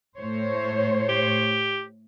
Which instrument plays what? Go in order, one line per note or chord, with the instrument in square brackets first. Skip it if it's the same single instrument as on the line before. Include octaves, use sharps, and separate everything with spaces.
[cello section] A2 C5 C#5
[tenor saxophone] G4